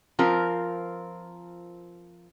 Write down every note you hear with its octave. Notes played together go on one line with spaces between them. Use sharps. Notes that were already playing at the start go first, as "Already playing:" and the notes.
F3 C4 F4 A#4